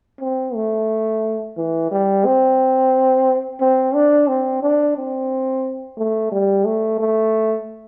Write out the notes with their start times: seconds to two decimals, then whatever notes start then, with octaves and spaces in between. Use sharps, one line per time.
0.21 C4
0.55 A3
1.57 E3
1.92 G3
2.25 C4
3.61 C4
3.94 D4
4.28 C4
4.63 D4
4.97 C4
5.97 A3
6.32 G3
6.65 A3
6.99 A3